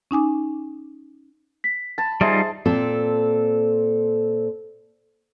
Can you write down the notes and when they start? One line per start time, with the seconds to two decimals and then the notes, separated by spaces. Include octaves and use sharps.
0.11 C#4 D#4 G#5 D6
1.64 B6
1.98 A5 B5
2.21 G3 D#4 F4 G#4 C5 E5 A5
2.65 A#2 C4 A4